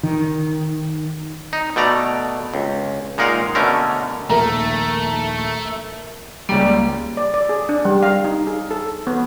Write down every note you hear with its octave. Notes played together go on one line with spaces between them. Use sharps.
D#3
D#4
B2 A3 D5 A#5
C#2
A#2 G#3 D#4 A#4 F5 F#5
B2 D3 A3 C#4 A#4
A#1 D#2 D#3 A3 A#4 A#5
C#2 G3 A#3
D5
D5
G#4
D4
G3
F5
D#4
G#4
A4
B3